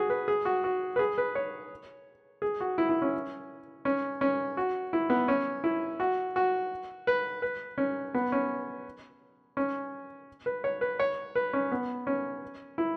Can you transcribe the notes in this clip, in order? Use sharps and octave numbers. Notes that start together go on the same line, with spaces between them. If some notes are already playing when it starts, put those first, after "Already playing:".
Already playing: F#4 G#4
B4
G#4
F#4
F#4
B4
G#4
B4
C#5
G#4
F#4
E4
E4
C#4
C#4
C#4
F#4
E4
B3
C#4
E4
F#4
F#4
B4
B4
C#4
B3
C#4
C#4
B4
C#5
B4
C#5
B4
C#4
B3
C#4
E4